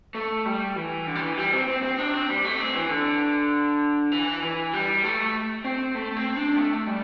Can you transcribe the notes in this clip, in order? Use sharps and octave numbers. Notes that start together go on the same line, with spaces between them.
A3
G3
E3
D3
G3
E3
G3
C4
C4
C4
D4
C4
G3
A3
C4
E3
D3
E3
E3
G3
A3
C4
A3
C4
D4
A3
G3